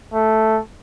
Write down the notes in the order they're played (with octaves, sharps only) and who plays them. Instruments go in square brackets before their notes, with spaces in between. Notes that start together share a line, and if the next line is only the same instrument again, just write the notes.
[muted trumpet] A3